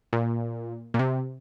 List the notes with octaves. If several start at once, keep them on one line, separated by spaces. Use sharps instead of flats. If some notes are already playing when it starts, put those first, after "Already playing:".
A#2
A#2
C3